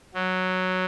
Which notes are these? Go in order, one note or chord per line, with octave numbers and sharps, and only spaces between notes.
F#3